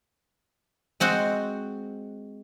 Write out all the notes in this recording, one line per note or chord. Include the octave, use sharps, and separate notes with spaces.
G#3 C4 F#4